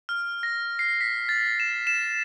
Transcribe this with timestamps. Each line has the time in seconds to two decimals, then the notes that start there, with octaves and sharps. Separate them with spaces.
0.09 F6
0.43 A#6
0.79 C7
1.01 B6
1.29 A6
1.60 E7
1.87 E7